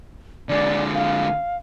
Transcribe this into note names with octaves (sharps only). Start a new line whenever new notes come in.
D3 G#3 D5
F5